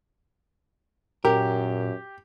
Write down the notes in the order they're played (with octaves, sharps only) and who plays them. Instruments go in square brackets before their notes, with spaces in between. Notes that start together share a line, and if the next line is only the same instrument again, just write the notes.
[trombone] F#2 [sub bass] A#2 [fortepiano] G4 [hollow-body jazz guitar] A#4